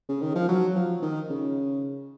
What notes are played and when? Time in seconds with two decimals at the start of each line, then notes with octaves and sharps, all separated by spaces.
0.09 C#3
0.22 D#3
0.35 F3
0.48 F#3
0.76 F3
1.02 D#3
1.30 C#3